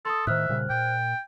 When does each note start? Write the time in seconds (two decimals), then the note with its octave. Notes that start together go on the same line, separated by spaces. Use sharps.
0.05 A4 C6 D#6
0.27 A2 D#3 C5 E5 F6 F#6
0.49 A#2 C#3 G3
0.70 A#2 G5